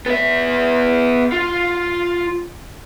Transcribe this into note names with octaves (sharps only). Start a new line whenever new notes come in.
B3 E5
F4